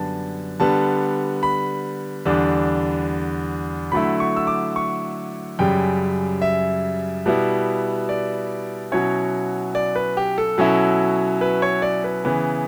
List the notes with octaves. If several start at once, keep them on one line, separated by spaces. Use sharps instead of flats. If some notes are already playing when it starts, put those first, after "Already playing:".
Already playing: F#2 D3 G3 B3 D4 A5
D3 G3 B3 A5
B5
E2 D3 G3 D4
D3 F#3 A3 E4 B5
C#6
E6
D6
C#6
F#2 C#3 G3 G5
E5
B2 G3 B3 E4
D5
B2 F#3 C#4 E4 C#5
D5
B4
G4
A4
B2 F#3 C#4 E4
B4
C#5
D5
B4
C#3 E3 B3